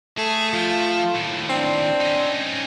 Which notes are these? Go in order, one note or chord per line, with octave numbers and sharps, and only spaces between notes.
A3 G#4
F3 F4
D#2 A2
C4 D4
C#4 D#4